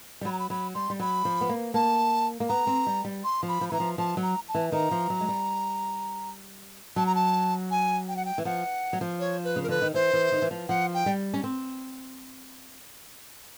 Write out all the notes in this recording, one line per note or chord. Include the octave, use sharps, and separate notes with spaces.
G3
F#3 B5
A#5
B5
F#3 B5
G3 C6
G3
F#3 B5
F3
B3
A#3
A#3 A5
A#3
B3 A#5
C4
G3
G3
C6
F3
B5
F3
B5
E3 A#5
F3
F3 A5
F#3
A#5
A5
E3
D#3 A#5
F3
F#3
G#3
G3
F#3 A5
A#5
A5
G#5
G5
F#5
G5
E3
F3 F#5
F#3
F3
C#5
B4
C#3
A#4
D3 B4
D#3
E3 C5
E3
D#3
E3
F3
F3 F#5
G5
G3
C#4
C4